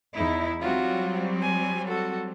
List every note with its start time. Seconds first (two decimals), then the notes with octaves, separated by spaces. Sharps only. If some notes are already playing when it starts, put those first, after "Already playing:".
0.14 E2 D#4 E4
0.61 F#3 G3 C4 F4 F#4
1.42 G#5
1.88 F#4 A4